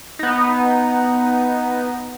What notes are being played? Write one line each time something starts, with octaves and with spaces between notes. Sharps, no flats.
B3 D#4